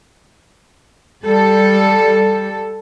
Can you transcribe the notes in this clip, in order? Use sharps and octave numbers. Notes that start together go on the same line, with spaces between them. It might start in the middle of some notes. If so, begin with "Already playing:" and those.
G3 A4